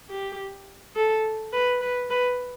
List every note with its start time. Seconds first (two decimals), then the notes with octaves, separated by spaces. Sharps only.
0.10 G4
0.96 A4
1.53 B4
1.81 B4
2.10 B4